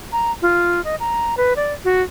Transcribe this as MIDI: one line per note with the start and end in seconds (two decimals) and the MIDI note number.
0.12 0.32 82
0.42 0.83 65
0.84 0.95 75
1.00 1.35 82
1.37 1.53 71
1.56 1.73 74
1.85 2.01 66